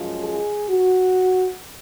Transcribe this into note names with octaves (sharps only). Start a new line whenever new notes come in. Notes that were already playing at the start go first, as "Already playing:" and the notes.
Already playing: F#2 F3 G#3
G#4
F#4